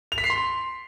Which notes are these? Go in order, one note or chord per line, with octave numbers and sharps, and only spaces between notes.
F7
B6
C7
C6